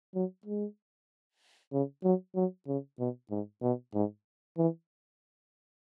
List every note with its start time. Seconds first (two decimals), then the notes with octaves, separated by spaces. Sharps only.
0.15 F#3
0.46 G#3
1.73 C#3
2.04 F#3
2.36 F#3
2.67 C#3
2.99 B2
3.31 G#2
3.62 B2
3.94 G#2
4.58 E3